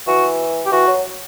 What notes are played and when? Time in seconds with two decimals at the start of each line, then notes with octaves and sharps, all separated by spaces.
0.07 E3 F#4
0.66 G4
0.72 E3 F#4
0.88 F#3